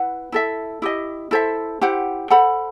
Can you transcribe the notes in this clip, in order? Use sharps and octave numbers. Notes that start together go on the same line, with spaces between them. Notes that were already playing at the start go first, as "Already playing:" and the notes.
Already playing: E4 B4 F#5
E4 A4 E5
E4 G4 D#5
E4 A4 C5 E5
E4 G4 C5 F#5
A4 C5 F#5 B5